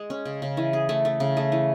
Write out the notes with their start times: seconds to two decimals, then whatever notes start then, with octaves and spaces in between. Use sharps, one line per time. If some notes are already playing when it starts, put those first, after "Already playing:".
Already playing: G#3
0.10 C#4
0.25 C#3
0.42 C#3
0.57 E3
0.73 G#4
0.89 A3
1.05 A3
1.20 C#3
1.37 A3
1.52 E3